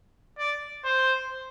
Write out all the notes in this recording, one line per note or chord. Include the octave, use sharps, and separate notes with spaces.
D5
C5